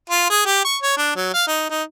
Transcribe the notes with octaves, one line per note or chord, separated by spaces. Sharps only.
F4
G#4
G4
C#6
C#5
D4
F#3
F5
D#4
D#4